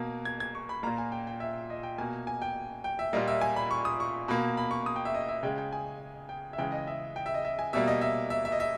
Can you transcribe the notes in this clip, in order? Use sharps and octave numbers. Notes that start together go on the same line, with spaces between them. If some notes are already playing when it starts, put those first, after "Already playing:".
Already playing: B2 A#3
G#6
G#6
C#6
B5
A#2 A#3 A#5
G#5
G5
G5
E5
D#5
G5
B2 A#3 G#5
G#5
G5
G5
E5
A#2 G3 A#3 D#5
E5
G#5
B5
C#6
D#6
C#6
B2 A#3 B5
B5
C#6
D#6
G5
E5
D#5
E5
C#3 G#3 G5
G5
G#5
G5
E5
C#3 E3 G#3 G5
D#5
E5
G5
E5
D#5
E5
G#5
B2 G3 A#3 E5
D#5
E5
E5
E5
D#5
E5